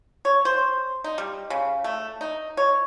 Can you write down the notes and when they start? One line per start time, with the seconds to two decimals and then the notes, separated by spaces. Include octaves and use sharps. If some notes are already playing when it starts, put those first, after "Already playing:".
0.25 C#5
0.45 C5
1.04 D#4
1.18 G3
1.50 C#3
1.84 A3
2.21 D#4
2.57 C#5